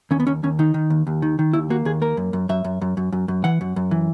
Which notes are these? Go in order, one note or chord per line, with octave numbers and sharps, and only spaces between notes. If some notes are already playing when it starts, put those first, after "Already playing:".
D#2 C#4
B3
D#2 C#4
D#2 C#4
D#3 D#4
D#3
D#2
D#2
D#3
D#3
D#2 E4
A#3 F#4
D#2 G#4
A#3 A#4
F#2
F#2
F#2 E5
F#2
F#2
F#2
F#2
F#2
E3 F#5
F#2
F#2
E3